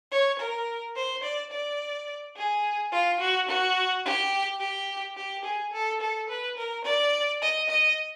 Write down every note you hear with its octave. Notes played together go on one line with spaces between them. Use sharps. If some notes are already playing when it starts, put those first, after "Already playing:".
C#5
A#4
C5
D5
D5
G#4
F4
F#4
F#4
G4
G4
G4
G#4
A4
A4
B4
A#4
D5
D#5
D#5